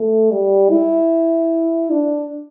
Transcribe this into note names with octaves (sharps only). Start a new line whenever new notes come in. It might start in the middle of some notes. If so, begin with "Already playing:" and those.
Already playing: A3
G3
E4
D4